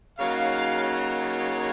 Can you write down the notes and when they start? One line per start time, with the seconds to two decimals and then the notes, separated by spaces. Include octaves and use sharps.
0.18 C#3 F#3 A#3 D#4 C#5 F5
0.83 C#5 F5